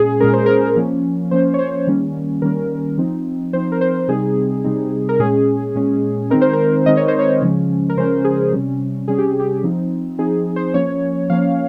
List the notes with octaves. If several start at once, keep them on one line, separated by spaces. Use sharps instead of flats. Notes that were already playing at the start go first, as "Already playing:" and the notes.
Already playing: A#2 G#3 C#4 G#4
A#2 G#3 C#4 A#4
C5
A#4
F3 A#3 C#4
F3 A#3 C#4 C5
C#5
C5
D#3 G3 A#3 C#4
D#3 G3 A#3 C#4 A#4
F3 C4 D#4
F3 C4 D#4 C5
A#4
C5
C3 G3 C4 D#4 G#4
C3 G3 C4 D#4
A#4
A#2 G#3 C#4 G#4
A#2 G#3 C#4
D#3 G#3 C4 D#4 A#4
C5
A#4
D#3 G#3 C4 D#4 D#5
C#5
C5
C#5
C#3 F3 G#3 C#4
A#4
C#3 F3 G#3 C#4 C5
G#4
C3 G3 C#4
C3 G3 C#4 G#4
G4
G4
F3 C4 D#4
F3 C4 D#4 G#4
C5
F3 A#3 C#4 C#5
F3 A#3 C#4 F5